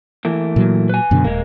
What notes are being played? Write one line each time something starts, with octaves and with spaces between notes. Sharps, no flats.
E3 A3 A#3
A#2 F#3
B4 G#5
F#2 B2 D3
D#1 G#3 A#3